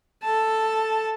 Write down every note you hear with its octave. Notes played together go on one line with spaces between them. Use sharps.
A4 A5